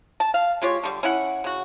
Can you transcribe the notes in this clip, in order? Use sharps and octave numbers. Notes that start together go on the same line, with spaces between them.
A5
F5
G#3 F4 G4 C#5
D3 G3
C#4 E4 F#5
C#3 F#4